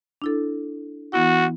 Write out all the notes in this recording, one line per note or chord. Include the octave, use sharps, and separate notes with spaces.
D4 E4 A4
E3 B3 E4 F#4